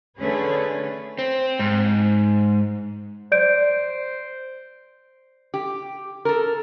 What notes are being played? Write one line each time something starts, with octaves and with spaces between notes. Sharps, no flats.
D3 A3 C#4 G#4 B4
C4
G#2
C5 D5 G6 D7
G4
A4 A#4